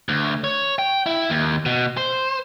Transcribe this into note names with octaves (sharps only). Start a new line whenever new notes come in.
D2
C#5
G5
E4
D#2
B2
C5